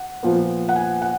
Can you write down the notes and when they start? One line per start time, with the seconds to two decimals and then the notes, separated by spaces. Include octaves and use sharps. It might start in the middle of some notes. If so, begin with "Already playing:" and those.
Already playing: F#5
0.23 A#2 F3 B3
0.69 F#5
0.76 G#5
1.02 F#5